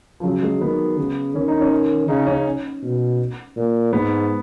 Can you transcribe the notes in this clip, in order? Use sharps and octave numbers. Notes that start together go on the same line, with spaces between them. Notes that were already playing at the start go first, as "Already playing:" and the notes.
F3
C#3 F#3
G#3
D#3 B3
C#3
D#3 C#4
D#4
C#4
C#3 D#4
C#4
B2
A#2
G#2 B3